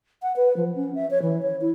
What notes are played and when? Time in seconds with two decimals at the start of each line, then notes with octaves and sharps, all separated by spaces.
0.22 F#5
0.36 B4
0.57 F3
0.76 C#4
0.95 E5
1.11 C#5
1.22 E3
1.42 C#5
1.61 E4